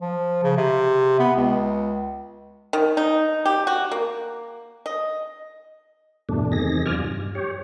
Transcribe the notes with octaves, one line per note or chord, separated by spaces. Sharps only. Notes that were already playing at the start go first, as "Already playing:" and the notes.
F3
C#3
C3
B3
C#2
D#3
D#4
G4
F#4
A#3
D#5
E2 G2 B2 A3 D4
E2 C3 D#3 G#4 A#6
F#2 F4 D5 G#5 F6
G2
G4 C#5